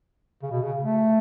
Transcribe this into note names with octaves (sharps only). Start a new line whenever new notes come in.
C#3
B2
C#3
A3